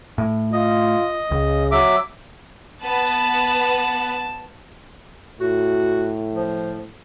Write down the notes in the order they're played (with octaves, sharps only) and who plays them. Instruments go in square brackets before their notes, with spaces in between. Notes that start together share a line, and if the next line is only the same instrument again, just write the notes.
[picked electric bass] A2
[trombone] F4 [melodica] D#5
[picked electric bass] C#2 [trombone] C#3
[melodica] F#3 E5 D6
[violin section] B3 B4 [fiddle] A5
[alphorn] A2 [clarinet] F#4
[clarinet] F3